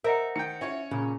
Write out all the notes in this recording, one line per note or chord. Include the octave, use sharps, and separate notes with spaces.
A#4 C5 D#5 E5 F#5
D#3 G5 C#7
C#4 E4 F4 C#5
A#2 C#3